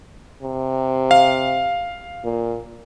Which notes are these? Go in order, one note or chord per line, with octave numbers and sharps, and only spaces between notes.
C3
F5
A#2